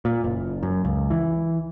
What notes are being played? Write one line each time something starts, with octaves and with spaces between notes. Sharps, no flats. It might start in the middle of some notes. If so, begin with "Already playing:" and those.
A#2
F#1
F#2
C#2
E3